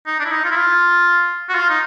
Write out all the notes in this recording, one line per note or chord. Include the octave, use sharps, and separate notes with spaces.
D#4
D4
E4
D#4
F4
E4
F4
F#4
F4
D#4